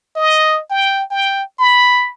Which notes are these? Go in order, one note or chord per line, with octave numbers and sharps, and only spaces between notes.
D#5
G5
G5
B5